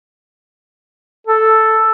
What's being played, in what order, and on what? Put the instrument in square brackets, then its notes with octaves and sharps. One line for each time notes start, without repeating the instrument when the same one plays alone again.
[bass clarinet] A4